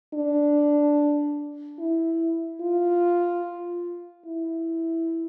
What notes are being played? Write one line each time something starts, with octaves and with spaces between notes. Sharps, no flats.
D4
E4
F4
E4